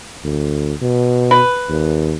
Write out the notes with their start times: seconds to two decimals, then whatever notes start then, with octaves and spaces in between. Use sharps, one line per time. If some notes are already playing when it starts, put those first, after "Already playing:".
0.24 D2
0.82 B2
1.31 B4
1.69 D#2